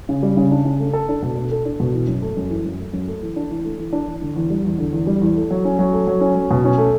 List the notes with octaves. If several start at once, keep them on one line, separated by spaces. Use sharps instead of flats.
C#3
G3
C#3
D4
C#3
A3
A4
D4
B2
A3
A4
D4
B2
E3
F#2
A3
F#2
E3
F#2
A3
F#2
A3
E3
D4
E3
A3
E3
D4
E3
D3
E2
G3
E2
D3
E2
G3
E2
A3
F#3
C#4
F#3
A3
F#3
C#4
F#3
B2
C#4
A3